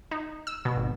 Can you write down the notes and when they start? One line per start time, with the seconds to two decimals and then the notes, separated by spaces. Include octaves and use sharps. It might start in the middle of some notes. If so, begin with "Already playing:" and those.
0.11 D#4
0.47 E6
0.65 B2
0.77 G#1